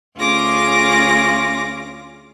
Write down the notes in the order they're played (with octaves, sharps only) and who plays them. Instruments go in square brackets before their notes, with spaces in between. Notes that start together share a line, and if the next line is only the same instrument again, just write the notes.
[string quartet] D2 C#4 F4 G#4 D6 A#6